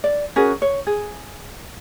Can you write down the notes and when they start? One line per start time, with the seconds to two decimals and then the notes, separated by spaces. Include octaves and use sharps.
0.04 D5
0.36 C#4 F#4 G#4 A#4
0.62 C#5
0.87 G#4